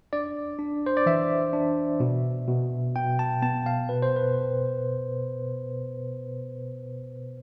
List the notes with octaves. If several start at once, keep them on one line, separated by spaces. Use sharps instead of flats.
D4 D5
D4
C5
D5
E3 E5
D4
B2
B2
B2 G5
A5
B3 A5
F5
B2 B4
C5
B4